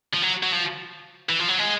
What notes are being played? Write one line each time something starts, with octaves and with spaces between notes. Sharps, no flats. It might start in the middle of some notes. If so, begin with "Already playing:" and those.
F3
F#3
F#3
F3
E3
F3
F#3
G#3